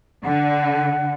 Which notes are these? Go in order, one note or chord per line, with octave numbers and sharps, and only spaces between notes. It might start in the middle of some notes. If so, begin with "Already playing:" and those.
D3 F#5